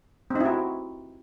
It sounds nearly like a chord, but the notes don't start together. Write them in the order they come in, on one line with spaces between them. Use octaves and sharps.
C4 D#4 E4 F#4